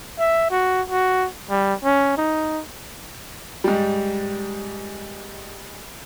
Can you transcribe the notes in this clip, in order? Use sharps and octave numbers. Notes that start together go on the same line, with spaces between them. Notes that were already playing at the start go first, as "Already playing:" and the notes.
E5
F#4
F#4
G3
C#4
D#4
G#2 G3